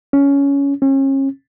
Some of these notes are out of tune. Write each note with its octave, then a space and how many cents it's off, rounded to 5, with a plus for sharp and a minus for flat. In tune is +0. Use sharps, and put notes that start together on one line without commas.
C#4 +15
C#4 -35